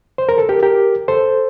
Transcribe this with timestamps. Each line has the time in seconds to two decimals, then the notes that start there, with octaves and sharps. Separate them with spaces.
0.18 C5
0.29 A#4
0.38 A4
0.49 G4 A#4
0.63 G4 A#4
1.08 A4 C5